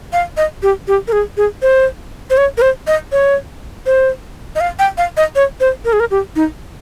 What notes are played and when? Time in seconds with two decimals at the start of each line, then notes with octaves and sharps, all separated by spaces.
0.13 F5
0.37 D#5
0.63 G4
0.88 G4
1.08 A#4
1.12 G#4
1.37 G#4
1.62 C5
2.30 C5
2.37 C#5
2.58 A#4
2.62 C5
2.87 D#5
3.12 C#5
3.86 C5
4.55 D#5
4.61 F5
4.79 G5
4.98 F5
5.17 D#5
5.36 C#5
5.60 C5
5.85 A#4
5.93 G#4
6.00 A#4
6.11 G4
6.36 D#4